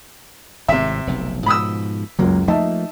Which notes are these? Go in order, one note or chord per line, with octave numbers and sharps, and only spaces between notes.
G#1 A2 C3 E5
F1 B1
G#2 B2 F3 B5 D#6 E6
C#2 F#2 F#3 A#3
F3 A3 A#3 D#4 E5 A5